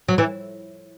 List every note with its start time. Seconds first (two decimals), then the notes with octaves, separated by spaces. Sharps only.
0.09 F#3
0.18 E3